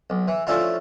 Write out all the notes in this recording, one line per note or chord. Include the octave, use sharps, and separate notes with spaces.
B1
E3
F3 A3 C#4 D4 E4 F4